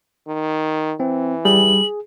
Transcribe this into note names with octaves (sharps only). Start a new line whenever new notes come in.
D#3
E3 C4
G3 G#4 F#7